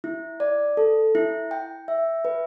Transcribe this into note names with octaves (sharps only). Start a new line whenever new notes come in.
E4
D5
A4
E4
G5
E5
B4